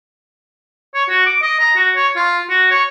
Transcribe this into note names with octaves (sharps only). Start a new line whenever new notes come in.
C#5
F#4
D6
D#5
A#5
F#4
C#5
F4
F#4
C#5